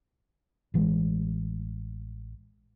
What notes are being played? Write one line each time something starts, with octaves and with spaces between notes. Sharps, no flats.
A1 E3 F3 G#3